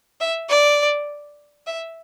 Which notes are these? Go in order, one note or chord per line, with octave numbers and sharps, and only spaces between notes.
E5
D5
E5